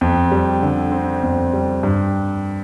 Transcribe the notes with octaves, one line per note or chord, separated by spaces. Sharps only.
F2
G3
D3
C4
F2
G3
G2